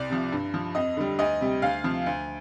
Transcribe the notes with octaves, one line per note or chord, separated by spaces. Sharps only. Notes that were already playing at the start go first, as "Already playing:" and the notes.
Already playing: C2 D5
C3 F3
G2
F3
F2 D#5
D3 G3
D2 D#5
C3 G3
D2 F5
C3 F3
D2